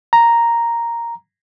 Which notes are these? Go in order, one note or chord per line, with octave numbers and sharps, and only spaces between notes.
A#5